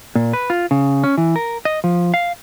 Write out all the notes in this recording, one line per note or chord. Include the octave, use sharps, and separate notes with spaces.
A#2
B4
F4
C#3
C#4
E3
A#4
D#5
F3
F5